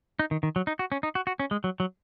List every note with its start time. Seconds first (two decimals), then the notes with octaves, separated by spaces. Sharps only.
0.19 D#4
0.31 D#3
0.43 D#3
0.56 F#3
0.67 D#4
0.79 F#4
0.92 C#4
1.03 D#4
1.15 F#4
1.27 F#4
1.40 C#4
1.51 G#3
1.64 F#3
1.80 F#3